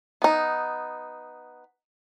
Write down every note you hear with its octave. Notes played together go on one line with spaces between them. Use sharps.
B3 D#4